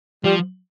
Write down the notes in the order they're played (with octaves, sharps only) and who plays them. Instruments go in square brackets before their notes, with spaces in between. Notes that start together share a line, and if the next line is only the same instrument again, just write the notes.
[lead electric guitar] F3 [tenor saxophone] G3